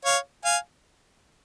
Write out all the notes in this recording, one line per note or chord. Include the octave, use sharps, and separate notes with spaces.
C#5 F5
F5 G#5